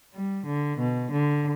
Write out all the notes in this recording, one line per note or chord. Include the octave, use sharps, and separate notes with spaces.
G3
D3
B2
D3